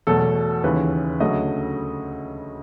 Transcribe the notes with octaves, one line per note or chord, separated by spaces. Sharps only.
E2 B2 F#3 A3 A4
D#2 C#3 E3 B4
D2 C#3 F#3 A3 D#5